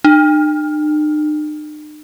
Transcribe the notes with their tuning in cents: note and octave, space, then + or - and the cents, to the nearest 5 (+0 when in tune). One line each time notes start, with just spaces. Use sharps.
D#4 -45